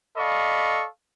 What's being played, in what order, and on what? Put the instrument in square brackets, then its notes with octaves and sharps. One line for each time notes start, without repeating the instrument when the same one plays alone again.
[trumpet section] A4 D5 D#5 F5 B5 C#6